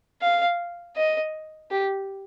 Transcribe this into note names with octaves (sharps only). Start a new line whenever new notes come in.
F5
D#5
G4